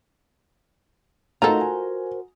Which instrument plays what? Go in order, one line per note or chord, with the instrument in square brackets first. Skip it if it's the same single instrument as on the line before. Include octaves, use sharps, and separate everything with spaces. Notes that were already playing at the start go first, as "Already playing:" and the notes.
[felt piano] A3 D#4 [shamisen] F4 A4 [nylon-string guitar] F#4 A#4 C5 [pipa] A#5
[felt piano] G#5